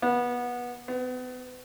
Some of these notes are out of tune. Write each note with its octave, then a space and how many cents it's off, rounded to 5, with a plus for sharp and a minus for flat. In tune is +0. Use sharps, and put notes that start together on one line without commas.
B3 -20
B3 +35